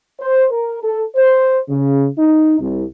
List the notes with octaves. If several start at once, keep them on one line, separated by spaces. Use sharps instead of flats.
C5
A#4
A4
C5
C#3
D#4
C2